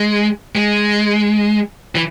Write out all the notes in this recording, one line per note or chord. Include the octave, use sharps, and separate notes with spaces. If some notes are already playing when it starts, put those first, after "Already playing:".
Already playing: G#3
G#3
E3